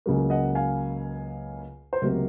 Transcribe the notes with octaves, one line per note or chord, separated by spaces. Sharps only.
C#2 C#3 F#3 A#3
D#5 F#5
F5 G#5
C5
C#2 C3 F#3 A#3 A#4